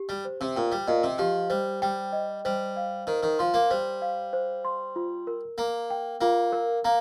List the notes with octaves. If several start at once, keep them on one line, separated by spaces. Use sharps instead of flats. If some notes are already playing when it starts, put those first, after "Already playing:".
Already playing: G4
G3
C5
C3
A#2 G5
G3
A#2 D#5
C3
F3 G4
G3 C5
G3 G5
D#5
G3 C5
F5
D#3 C5
D#3
F3 C6
A#3
G3 C5
F5
C5
C6
F4
A#4
A#3 A#5
G5
A#3 F4
A#4
A#3 A#5